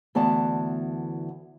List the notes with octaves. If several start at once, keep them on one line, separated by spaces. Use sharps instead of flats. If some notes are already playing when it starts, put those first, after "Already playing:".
D2 E3 B3 D5 F#5 A5